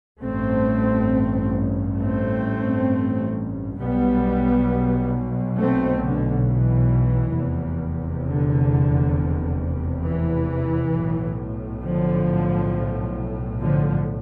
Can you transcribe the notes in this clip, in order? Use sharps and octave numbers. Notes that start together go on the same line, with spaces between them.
A1 G2 A3 C4
A3 C4
B1 B2 G3 B3
A3 C4
D3
E3
F1 E2 C3
D3
E3
B1 A2
D3 F3
D3 F3